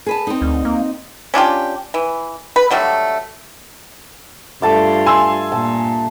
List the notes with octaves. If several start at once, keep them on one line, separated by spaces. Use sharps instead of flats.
G#4 B4 A5
C4 D#4
D2
A#3
C#4 D4 F4 G4
E3
B4
D3 F#3 G3 A3
G2 A3 F4 A5 D6
G#5 C6 E6
A#2 A5